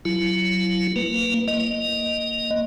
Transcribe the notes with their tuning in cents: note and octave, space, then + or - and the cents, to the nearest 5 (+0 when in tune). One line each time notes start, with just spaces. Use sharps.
F#3 +10 E4 +30
A#3 -20 B4 +0
A#3 +0 D#5 +0